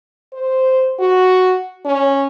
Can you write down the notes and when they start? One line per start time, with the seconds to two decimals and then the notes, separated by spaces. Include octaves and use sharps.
0.33 C5
0.99 F#4
1.85 C#4